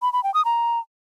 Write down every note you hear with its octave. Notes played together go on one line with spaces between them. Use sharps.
B5
B5
G5
D#6
A#5